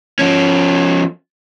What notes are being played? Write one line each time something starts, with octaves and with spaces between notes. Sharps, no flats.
F3 C#4